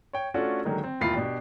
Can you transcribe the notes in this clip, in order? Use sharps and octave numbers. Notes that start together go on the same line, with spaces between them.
C#5 G5
A3 C#4 D4 F4 F#4 A4
D3 D#3 F#3 G#3 A#3
C4
E1 D#2 E4 F4 B5 C7
B2 D4 G4